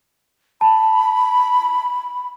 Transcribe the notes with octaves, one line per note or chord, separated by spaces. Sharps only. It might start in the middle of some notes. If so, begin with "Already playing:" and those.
A5 B5